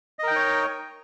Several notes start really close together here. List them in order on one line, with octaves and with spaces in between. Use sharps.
D#5 A#4 G5 D#4 C#5